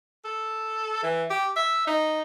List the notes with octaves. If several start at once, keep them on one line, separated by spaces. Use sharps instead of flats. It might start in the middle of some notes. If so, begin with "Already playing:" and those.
A4
E3
G4
E5
D#4